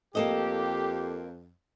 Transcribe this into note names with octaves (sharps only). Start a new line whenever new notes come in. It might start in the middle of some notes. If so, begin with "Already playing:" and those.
F2 A#3 G4 A4 D#5